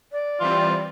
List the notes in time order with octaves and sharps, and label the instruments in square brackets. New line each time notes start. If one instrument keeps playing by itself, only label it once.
[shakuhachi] D5
[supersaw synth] E3 G3 C4 [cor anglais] F4